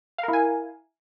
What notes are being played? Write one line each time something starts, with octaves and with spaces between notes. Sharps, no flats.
E4 A#4 F5 G#5